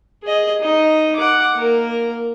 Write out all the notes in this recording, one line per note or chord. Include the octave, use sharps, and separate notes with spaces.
G#4 D#5
D#4 D#5
F#5 D6
A#3 A#4